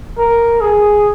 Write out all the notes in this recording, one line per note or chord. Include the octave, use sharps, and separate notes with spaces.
A#4
G#4